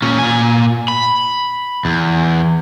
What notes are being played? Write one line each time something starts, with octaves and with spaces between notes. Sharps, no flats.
A#2 C#4
A#2 G#5
B5
E2